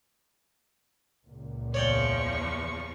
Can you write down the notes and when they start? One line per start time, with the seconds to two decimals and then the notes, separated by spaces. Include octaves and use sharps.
1.25 C#2 A#2
1.74 E2 F3 C#5 D5 G5 C#6